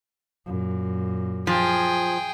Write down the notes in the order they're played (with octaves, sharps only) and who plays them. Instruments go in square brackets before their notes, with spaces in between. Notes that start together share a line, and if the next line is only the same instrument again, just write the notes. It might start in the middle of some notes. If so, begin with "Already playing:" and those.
[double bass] F#2 A#2
[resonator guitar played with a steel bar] F3 [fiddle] G#4 G5